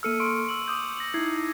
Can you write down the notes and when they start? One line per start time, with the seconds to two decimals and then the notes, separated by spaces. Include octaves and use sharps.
0.03 A#3 A4 E6 F6 C#7 D#7
0.20 C6 C#6 D7
0.49 E6 F#7
0.68 D6 D#6 G6
0.97 A#6 F#7
1.14 D#4 E4 G#6 C7